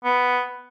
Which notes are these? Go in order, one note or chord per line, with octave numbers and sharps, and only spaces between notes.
B3